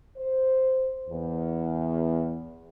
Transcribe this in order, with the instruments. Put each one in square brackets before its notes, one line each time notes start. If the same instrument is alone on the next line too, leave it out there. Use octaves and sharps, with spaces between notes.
[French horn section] C5
E2